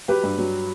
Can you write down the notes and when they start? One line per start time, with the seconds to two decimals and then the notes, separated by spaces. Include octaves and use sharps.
0.08 F#3 G4 B4
0.24 G2
0.38 F#3